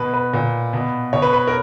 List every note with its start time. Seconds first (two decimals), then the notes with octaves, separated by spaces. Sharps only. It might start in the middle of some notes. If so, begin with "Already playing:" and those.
Already playing: B2 B4
0.14 B4
0.33 A#2
0.73 B2
1.13 B2 C#5
1.22 B4
1.33 B4
1.47 A#4